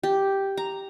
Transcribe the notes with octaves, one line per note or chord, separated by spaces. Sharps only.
G4
A#5